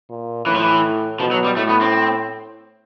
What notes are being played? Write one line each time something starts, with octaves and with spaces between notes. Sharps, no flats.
A#2
A2 E3
F3
E3
B2 F3
F#3
G3
A2 A3
B3
C4